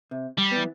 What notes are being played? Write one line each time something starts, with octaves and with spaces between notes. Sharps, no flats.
C3
G3
E3 B3